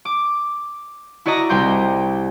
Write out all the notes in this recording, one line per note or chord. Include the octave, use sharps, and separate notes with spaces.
D6
E4 F#4 D5 D#5 A#5
C2 G5 C6 G6